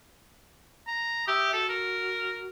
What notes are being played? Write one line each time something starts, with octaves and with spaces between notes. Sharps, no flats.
A#5
G4 E5 D#6 E6
F#4 A4
A#4